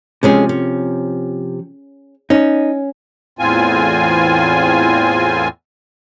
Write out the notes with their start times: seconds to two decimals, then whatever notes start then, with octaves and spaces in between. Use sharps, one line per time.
0.23 C3 F3 G#3 C#4 G#4
0.49 C#4
2.30 C#4 D#4
3.39 E2 A2 C4 F4 G#5